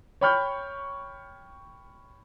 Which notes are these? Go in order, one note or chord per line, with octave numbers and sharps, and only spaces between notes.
C#5 G5 B5 C#6 F6 G6